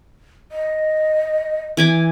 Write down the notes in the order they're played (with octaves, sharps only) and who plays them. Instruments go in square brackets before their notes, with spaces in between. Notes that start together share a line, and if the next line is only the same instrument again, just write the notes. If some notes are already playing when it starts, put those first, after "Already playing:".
[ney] D#5
[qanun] E3 G#5 D6